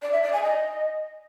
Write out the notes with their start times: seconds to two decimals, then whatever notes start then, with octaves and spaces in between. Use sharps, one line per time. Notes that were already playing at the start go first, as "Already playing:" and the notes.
0.02 D5
0.13 E5
0.23 D5
0.33 G#5
0.43 D#5